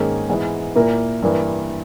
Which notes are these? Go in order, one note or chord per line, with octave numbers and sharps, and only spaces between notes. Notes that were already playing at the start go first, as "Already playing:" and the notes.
Already playing: G#2 D#3 A#3 C#4 G#4
G#2 E3 G#3 B3
A#2 A#3 E4 A#4
G2 E3 A#3